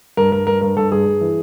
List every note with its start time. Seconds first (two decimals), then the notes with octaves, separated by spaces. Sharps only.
0.17 G2 A#4
0.32 G2 A#4
0.47 G2 A#4
0.61 G2 A#4
0.77 G2 A4
0.92 G2 G#4
1.06 G2
1.21 E3